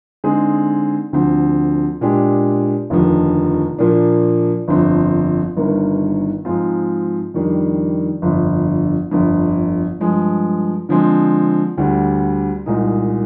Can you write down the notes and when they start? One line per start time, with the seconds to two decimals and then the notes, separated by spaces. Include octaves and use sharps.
0.24 D3 G#3 C4 D#4 G#4
1.13 D2 D3 F3 C4
2.01 A#2 G#3 D4 G4
2.90 F1 D#2 D3 F3
3.78 A#2 F3 A#3 D4
4.68 G1 F2 D3 F3 C4
5.57 G1 G2 D#3 A#3
6.45 G#2 F3 G#3 C4 F4
7.34 F2 D#3 G3 D4
8.22 G1 F2 D3
9.11 G1 F2 D3
10.00 G2 F3 G#3
10.89 D3 F3 G#3 C4
11.78 D2 D3 G3
12.66 C2 A#2 G#3 D#4